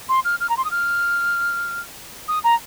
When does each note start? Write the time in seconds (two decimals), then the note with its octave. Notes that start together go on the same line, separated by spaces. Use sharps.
0.09 C6
0.25 F6
0.40 F6
0.50 A#5
0.57 C6
0.65 D#6
0.71 F6
2.28 D#6
2.44 A#5